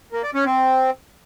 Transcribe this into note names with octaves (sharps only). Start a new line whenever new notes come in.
A#3
D5
C#4
C4